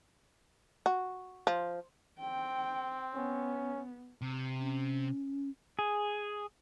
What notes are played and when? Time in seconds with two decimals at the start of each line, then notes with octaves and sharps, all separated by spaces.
0.86 F#4
1.47 F3
2.18 C4 G5
3.15 B3 C#4
4.22 C3
4.60 C#4
5.79 G#4